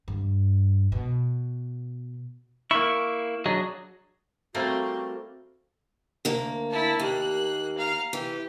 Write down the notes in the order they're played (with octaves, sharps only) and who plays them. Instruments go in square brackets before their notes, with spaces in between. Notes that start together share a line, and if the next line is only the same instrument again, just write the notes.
[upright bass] G2
B2
[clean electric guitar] A#3 E4 [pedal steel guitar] C#6
[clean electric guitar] F#3 [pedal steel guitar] D4 G#4 D#5
[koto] G3 A3 A#3 [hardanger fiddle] C4 [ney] F#4
[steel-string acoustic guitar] D2 A#3
[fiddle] E4 A5
[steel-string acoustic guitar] D#2 [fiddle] A#3 F#6
[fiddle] F5 A#5
[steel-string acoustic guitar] E3 [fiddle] G4